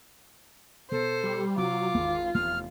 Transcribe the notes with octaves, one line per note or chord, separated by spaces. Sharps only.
B2 A4 C5
G3
C3 F#3 F4 D6
G#1 E2
F1 E2 F6